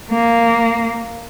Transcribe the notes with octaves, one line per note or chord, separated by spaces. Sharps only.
A#3